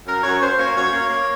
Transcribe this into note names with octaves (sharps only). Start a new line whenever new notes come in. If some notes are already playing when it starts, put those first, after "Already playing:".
F#2 A#4
F#2 C#5
F#2 C5
A#3 C#5
F#2 C#5
A#3
A#3